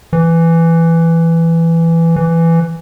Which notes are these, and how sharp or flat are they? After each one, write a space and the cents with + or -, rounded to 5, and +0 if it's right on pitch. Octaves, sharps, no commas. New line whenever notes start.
E3 +10
E3 +10